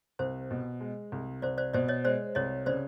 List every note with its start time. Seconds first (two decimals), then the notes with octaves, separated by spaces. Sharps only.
0.19 C2 C5
0.51 B2
0.81 G#3
1.12 C2
1.42 C2 C5 D5
1.58 C5 D5
1.74 B2 C5 D5
1.88 C#5 D#5
2.04 G#3 C5 D5
2.35 C2 C#5 D#5
2.66 C#3 C5 D5